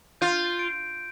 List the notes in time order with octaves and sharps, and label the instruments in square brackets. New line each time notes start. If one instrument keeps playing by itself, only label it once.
[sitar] F4 [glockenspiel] G6
[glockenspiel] D7